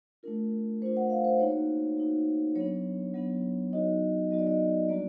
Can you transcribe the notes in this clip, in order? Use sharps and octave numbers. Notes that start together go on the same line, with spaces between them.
A3 D4 F4 A#4
A3 D4 F4 C5
F#5
F5
C5
A#3 D#4 F#4 C#5
A#3 D#4 F#4
F#3 B3 D4 C#5
F#3 B3 D4
F#3 B3 D#4 F#4 D#5
F#3 B3 D#4 F#4 D#5
D5
D#5
G3 A#3 D4 F#4 D5